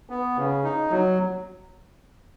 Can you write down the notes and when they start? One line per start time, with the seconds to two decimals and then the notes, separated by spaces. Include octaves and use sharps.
0.10 B3
0.37 C#3
0.64 D#4
0.90 F#3